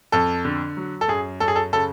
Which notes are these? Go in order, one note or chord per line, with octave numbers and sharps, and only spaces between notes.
F2 A4
D3
F#3
A4
F#2 G#4
F#2 A4
G#4
A4
C#3 A4